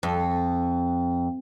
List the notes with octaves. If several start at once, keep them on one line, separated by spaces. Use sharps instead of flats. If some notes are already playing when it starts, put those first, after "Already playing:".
F2